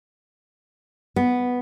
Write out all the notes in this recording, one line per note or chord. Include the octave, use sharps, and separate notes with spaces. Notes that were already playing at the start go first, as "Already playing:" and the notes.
B3